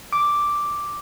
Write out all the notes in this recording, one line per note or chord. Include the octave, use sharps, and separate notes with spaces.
D6